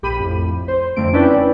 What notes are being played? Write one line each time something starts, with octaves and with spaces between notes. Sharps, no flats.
A#1 G4 B5 D#7
F2 A2
C5
F2 D3 F3 A3 C4 D7
C#4 D4 E4 B4 D5 G5